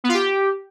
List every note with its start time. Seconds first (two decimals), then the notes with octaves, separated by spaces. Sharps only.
0.04 B3
0.09 F4
0.14 G4